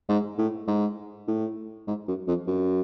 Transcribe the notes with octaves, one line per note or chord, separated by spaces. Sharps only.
G#2
A2
G#2
A2
G#2
F#2
F2
F#2